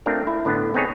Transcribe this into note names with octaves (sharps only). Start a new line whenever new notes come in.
A3 C4 D4 F4 A#4
E4
A2 D3 B3 D4
B3 C4 D#4 G#4 C#5